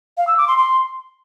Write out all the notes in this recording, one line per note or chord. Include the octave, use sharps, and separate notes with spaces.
F5
E6
D6
C6
C6